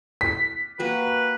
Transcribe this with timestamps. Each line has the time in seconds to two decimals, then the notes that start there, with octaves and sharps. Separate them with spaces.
0.21 B6
0.79 A#3 F#4 G4 B4